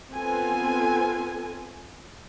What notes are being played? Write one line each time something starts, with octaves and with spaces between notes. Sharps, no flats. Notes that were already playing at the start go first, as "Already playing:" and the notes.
B3 C4 F4 A4 G#5